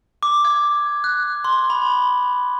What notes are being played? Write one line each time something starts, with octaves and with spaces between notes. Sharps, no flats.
D6
G#6
F#6
C6
B5